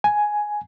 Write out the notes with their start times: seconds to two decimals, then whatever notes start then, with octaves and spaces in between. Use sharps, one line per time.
0.04 G#5